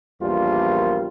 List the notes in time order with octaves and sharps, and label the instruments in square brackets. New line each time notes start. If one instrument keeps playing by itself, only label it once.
[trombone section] A#1 E2 G3 A#3 F4